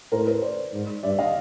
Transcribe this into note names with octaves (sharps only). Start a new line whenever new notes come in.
A2 A#4 C5
B4
A#4 C5
C5 D5
G#2
G2 D5 E5
D#5 F5